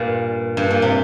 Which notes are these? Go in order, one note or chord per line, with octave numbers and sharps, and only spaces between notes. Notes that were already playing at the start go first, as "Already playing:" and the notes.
Already playing: G2 A#2
G2
A#2
C3